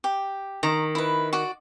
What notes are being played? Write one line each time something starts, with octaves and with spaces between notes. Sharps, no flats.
G4
D#3 A#5
E4 B4
F#4 D5